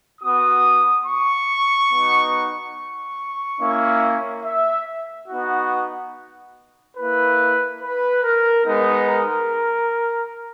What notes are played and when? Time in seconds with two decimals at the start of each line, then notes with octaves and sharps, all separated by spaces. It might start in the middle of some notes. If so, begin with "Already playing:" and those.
0.21 B3 F#4 D#6
1.06 C#6
1.91 B3 D#4 F#4
2.74 C#6
3.60 A#3 C#4 E4
4.44 E5
5.28 B3 D#4 F#4
6.97 A#3 E4 B4
7.81 B4
8.23 A#4
8.65 G#3 B3 D#4
9.08 A#4